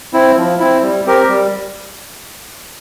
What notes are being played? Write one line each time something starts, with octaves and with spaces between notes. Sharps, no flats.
C4 E4
F3
C4 E4
G3
C4 G4 A#4
G3